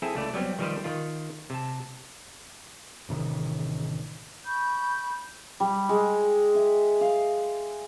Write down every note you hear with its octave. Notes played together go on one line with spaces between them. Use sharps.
C4 E4 G#4 A4
C#2 A3 D5
F#3 G3 B3 C4
D#3 F3 G3 G4 B4 C5
D#3 F4
C3 A5
A1 C3 D#3
B5 C#6 G6
G3
G#3
E5
F5